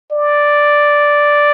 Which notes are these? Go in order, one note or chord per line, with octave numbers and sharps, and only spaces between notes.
D5